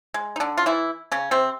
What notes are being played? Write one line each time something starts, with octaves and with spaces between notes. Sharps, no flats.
G#3
D#4
D3 D4
F4
E3 E4
C#3 C#4
C3 C4